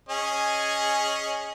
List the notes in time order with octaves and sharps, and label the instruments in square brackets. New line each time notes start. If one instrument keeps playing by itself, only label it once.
[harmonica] C#4 G#4 D#5